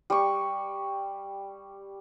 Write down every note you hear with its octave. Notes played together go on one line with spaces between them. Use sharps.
G3 C#6